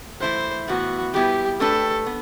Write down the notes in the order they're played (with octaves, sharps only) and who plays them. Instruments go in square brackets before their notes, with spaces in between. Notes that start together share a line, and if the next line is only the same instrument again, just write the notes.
[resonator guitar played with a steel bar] E3 A3 E4 [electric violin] C5
[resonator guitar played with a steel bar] A2 E3 B3 [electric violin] F#4
[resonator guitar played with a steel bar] G3 B3 E4 B4 [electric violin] G4
[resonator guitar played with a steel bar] A3 D4 G4 B4 [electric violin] A4
[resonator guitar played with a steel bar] B3